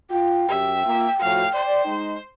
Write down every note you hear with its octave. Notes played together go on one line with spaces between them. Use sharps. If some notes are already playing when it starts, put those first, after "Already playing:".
F4 G5
F#2 G4 E5
A#3 F4
A2 F3 F#4 F5
C5 D5
G#3 D#4